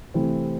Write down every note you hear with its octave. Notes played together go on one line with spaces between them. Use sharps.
C3 E3 A3 C4 E4